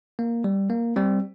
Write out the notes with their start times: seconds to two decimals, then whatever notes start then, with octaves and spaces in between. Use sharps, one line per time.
0.19 A#3
0.44 G3
0.70 A#3
0.96 G3 C4